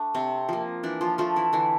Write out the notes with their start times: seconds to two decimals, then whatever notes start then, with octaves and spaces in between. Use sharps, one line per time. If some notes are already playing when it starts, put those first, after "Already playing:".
Already playing: A3 D4
0.15 C3 C4
0.49 F3 A#3
0.83 E3 D4
1.01 F3 F4
1.18 F3 A3 F4
1.36 E3 E4
1.53 D3 E3 E4